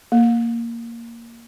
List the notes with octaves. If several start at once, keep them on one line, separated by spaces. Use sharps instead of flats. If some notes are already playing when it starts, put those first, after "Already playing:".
A#3